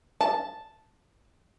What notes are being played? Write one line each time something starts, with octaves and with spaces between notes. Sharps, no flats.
A5